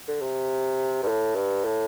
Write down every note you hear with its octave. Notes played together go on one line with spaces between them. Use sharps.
D3
C3
G2
A2
G2
A2